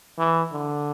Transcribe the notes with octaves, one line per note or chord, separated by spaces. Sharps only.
E3
D3